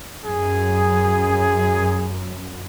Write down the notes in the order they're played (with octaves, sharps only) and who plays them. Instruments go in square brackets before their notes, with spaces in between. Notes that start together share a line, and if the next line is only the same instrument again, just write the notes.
[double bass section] F#2 [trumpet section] G#4